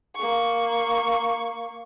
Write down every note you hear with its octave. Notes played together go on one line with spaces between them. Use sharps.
A#3 C#6